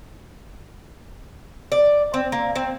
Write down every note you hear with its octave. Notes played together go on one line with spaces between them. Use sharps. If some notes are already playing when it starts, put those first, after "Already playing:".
D5
C4
A#3
C4